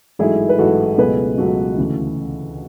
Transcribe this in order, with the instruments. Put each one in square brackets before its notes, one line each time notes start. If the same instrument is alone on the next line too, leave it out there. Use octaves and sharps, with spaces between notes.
[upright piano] A1 G#2 F#3 A3 E4 G#4
B4
A1 G#2 F#3 A3 F#4 A4
C#2 B2 F#3 A3 G#4 B4
C#2 B2 F#3 A3 F#4 A4
D2 C#3 E3